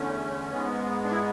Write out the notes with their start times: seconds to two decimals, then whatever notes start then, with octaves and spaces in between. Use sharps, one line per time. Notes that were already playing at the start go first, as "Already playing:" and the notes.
Already playing: E2 D3 A3 C#4
0.50 G#2 G#3 B3
1.03 D4
1.11 E4